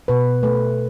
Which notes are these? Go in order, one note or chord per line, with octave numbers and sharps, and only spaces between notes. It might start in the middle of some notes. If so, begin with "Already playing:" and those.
B2 B4
A3 B4